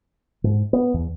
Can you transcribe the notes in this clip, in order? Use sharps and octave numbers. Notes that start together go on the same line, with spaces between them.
G#2
B3
E2